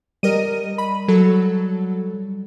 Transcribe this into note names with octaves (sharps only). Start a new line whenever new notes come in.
G3 A#4 D#5 D#7
B5
F#3 A4